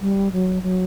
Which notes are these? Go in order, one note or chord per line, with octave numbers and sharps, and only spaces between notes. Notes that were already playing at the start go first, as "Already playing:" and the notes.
G3
F#3
F#3